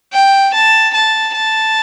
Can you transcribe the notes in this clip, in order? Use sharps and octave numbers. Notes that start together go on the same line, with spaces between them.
G5
A5
A5
A5